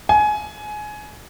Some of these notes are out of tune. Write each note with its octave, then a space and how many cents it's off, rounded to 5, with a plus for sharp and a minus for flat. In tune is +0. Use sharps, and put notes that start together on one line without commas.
G#5 +20